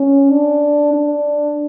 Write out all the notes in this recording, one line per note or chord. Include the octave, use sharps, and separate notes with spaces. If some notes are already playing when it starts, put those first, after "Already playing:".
Already playing: C#4
D4
D4